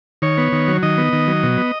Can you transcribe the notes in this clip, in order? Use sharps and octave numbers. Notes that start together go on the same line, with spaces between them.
D#3 C#5
B3
D#3
F#3
D#3 D#5
B3
D#3
F#3
B2
B3